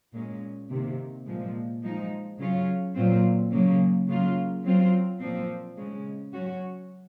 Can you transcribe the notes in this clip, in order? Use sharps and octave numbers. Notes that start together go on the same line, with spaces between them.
A#2 G#3 C#4
C3 D#3 A#3
A#2 F3 G#3
F3 G#3 D#4
C#3 F#3 C#4 F4
A#2 F#3 C4 F4
C#3 F#3 A#3 C#4
C#3 F#3 A#3 F4
F#3 C4 F4
A#2 F3 C4
C#3 G#3 C#4
F#3 C#4 F#4